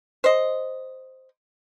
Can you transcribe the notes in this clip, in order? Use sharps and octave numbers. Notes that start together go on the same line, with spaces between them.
C5 D#5